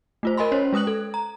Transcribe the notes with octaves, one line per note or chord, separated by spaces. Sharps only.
A3 F4 C5
A#4 D#5 G#5 B5 C6
C#4 C5 C#5
G#3 B4 D#6 F#6 F#7
A4
A#5